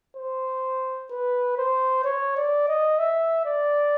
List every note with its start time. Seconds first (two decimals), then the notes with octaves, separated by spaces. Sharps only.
0.17 C5
1.11 B4
1.58 C5
2.04 C#5
2.37 D5
2.68 D#5
2.99 E5
3.46 D5